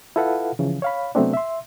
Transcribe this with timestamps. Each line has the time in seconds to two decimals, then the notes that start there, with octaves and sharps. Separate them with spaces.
0.16 E4 F4 A4 B4 F5 F#5
0.59 C#3 E3 F3
0.82 C#5 F5 B5
1.15 C3 F#3 A3 B3 C4 D4
1.34 E5 C6